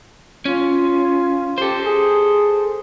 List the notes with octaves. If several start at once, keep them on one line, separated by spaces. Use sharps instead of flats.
C#4 F4
G4 A4 C5
G#4